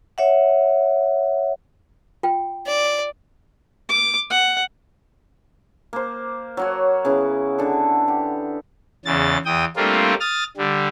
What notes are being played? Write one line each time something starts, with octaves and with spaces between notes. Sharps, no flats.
C#5 E5 F#5
F4 G5
D5
D6
F#5
A#3 C5
F#3 F#4 C#5
C#3 B3 E4
D3 A4
G4
E2 C#3 A6
E2 G5 D#6
G3 A3 A#3 C4 D4 F4
D#6 F6 A6
D3 G3